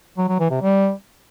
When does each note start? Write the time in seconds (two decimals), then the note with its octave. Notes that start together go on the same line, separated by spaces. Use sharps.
0.18 F#3
0.29 F#3
0.40 E3
0.51 C3
0.62 G3